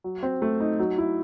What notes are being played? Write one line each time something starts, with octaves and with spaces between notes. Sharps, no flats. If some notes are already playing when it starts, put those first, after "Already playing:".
F#3
C4
A3
D#4
F#3
E4